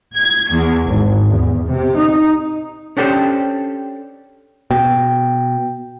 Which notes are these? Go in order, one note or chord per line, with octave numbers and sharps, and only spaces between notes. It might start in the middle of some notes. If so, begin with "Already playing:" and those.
G#6
E2
G#1
E2
C3
D#4
C#4 D4 G4 A4 C5 G5
B2 G5